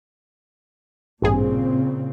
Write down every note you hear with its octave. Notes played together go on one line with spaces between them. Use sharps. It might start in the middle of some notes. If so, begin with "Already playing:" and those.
A1 G2 A#2 C#3 C4 G#4